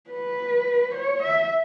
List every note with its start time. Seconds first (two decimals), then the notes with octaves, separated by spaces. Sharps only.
0.10 B4
0.94 C#5
1.22 E5